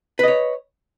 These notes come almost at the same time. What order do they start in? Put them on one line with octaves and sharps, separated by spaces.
B4 D#5 C#5